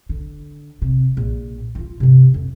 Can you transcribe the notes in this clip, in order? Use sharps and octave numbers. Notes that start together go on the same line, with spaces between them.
D3
C3
A#1
D#4 F4
G2 C3
F2